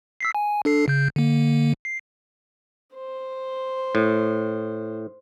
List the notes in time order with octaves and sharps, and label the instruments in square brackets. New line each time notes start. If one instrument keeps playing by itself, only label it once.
[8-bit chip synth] E6 B6 C7
G#5
D4 A4 C7
C#3 G6
D3 A#3
C7
[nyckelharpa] C5
[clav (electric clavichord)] A2